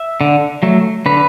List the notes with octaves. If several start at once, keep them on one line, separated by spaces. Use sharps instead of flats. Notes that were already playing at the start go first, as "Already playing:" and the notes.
Already playing: E5
D3
F#3 A3
D3 B4